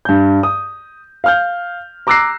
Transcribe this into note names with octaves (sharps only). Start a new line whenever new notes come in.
G2 G6
D#6
F5 F6 G6
A#5 D6 E6 F#6 A#6 C7